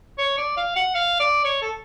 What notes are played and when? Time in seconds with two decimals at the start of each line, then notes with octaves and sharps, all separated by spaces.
0.19 C#5
0.37 D5
0.57 F5
0.76 F#5
0.95 F5
1.20 D5
1.45 C#5
1.62 A4